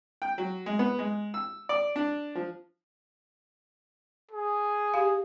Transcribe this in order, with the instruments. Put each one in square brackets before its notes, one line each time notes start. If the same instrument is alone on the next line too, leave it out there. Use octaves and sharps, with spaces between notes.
[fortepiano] G5
F#3
G#3
B3
G#3
E6
D5
D4
F3
[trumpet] G#4
[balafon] G4 F5